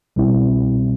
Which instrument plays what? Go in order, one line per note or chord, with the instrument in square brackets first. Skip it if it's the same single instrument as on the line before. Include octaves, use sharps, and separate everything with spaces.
[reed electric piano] C2 B2 G3 C4 E4